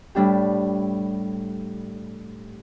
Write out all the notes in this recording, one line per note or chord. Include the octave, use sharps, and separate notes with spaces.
A2 G3 D4 G4